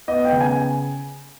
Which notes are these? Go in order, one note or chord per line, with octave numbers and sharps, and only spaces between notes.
B3 D#5
G5
C#3
G#5